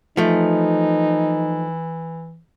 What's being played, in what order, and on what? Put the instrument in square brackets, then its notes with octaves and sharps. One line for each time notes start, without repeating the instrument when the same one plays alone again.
[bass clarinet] E3 [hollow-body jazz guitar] F3 A3 [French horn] D#4